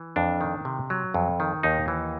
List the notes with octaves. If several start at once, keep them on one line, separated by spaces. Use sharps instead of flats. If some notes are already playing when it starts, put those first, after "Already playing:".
Already playing: E3
F2 D4
D#3
C3
F#3
F2
D#3
D#2 D#4
E3